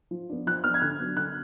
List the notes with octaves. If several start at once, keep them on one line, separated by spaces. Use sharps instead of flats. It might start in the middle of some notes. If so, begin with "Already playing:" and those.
F3
B3 D4
F3 F#6
B3 D4 F6
G#6
D3 F#6
F#3 B3 D4
D3 F#6